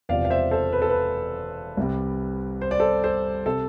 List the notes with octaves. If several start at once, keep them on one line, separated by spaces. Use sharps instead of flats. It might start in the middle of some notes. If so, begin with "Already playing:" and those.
E1 E2 C3 F3 D5 F5
F5
C5 E5
A4 C5
B4
A4
B4
C2 C3 G3
C5
D5
A4 C5
A4 C5
C3 A4